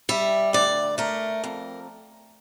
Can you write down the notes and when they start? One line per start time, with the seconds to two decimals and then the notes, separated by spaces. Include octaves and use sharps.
0.09 G3 E5
0.53 D2 D5
0.98 A3 A#4
1.44 F2